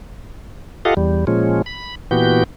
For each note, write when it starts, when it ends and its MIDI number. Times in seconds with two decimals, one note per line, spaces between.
0.85 0.94 65
0.85 0.94 67
0.85 0.94 69
0.85 0.94 75
0.85 0.94 77
0.85 0.94 78
0.97 1.25 40
0.97 1.25 55
1.27 1.62 46
1.27 1.62 53
1.27 1.62 56
1.27 1.62 61
1.66 1.95 83
2.11 2.44 46
2.11 2.44 52
2.11 2.44 59
2.11 2.44 66
2.11 2.44 67
2.11 2.44 91